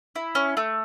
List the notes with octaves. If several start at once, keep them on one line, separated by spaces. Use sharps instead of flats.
E4
C#4
A3